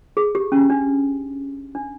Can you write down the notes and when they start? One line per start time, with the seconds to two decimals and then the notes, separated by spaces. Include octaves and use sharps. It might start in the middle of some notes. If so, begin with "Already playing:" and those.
0.17 G#4
0.35 G4
0.52 C#4
0.70 D4
1.75 D4